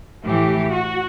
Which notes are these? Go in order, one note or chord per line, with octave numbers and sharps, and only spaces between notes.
A2 E3 G4
F#4